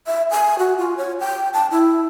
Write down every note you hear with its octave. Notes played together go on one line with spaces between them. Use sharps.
E5
G#5
F#4
F4
C#5
G5
A5
E4